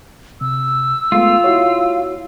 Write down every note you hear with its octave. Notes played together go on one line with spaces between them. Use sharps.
C3 E6
G#3 A3 B3 F4
E4 F#4 C#5